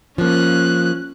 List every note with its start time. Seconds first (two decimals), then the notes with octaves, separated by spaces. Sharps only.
0.18 F3 A#3 C#4 F#6